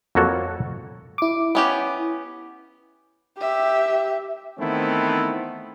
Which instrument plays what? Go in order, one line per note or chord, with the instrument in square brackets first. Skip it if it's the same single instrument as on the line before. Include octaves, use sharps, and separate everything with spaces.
[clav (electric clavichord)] F2 F#3 A#3 F#4 A4 C#5
[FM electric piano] E4 D6
[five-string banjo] B3 C#4 G4
[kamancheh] G4 E5
[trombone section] D#3 E3 A3 B3 C4 E4